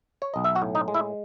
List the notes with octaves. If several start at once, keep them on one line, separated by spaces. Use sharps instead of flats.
C#5
B1 D#5
E5
F#4 F#5
A2
D#4 D#5
G#3
E4 E5